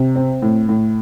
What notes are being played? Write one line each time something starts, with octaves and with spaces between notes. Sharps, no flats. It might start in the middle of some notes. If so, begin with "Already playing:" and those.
Already playing: C3
C4
A2
A2